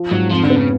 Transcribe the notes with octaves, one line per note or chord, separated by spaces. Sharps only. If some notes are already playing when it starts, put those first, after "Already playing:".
Already playing: F3
G#2 F#3
F2 F3
D3
B3
C#3